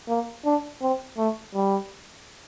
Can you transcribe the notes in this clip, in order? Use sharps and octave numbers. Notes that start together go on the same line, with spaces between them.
A#3
D4
C4
A3
G3